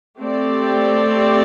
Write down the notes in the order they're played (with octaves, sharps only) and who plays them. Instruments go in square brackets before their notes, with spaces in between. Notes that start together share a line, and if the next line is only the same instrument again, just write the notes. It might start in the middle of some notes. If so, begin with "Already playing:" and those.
[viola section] A3 C4 G4 D5